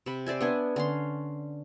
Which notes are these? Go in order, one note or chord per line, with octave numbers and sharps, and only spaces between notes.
C3 B5
C5 D5 E5 G#5
B3 D4 G#5
D3 C#4 C6